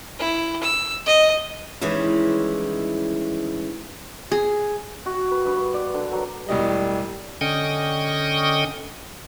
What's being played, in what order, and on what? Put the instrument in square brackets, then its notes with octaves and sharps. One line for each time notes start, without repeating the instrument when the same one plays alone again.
[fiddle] E4
E6
D#5
[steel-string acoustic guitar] D#3 E3 G3 G#3 C#4 E4
[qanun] G#4
[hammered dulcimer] F#4
B4
G2
D5
D3
F#3
[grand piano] E1 A2 D#5 [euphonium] G3
[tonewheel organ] D3 C#4 D#5 G5 C#6 D#6